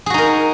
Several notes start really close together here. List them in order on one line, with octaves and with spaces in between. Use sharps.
G#4 F#4 D#4 A#4